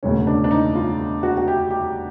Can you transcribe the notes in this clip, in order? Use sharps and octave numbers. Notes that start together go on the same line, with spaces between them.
E1 D2 C#3 C#4
D4
D4
D#4
F4
F#4
F#4
G4
G4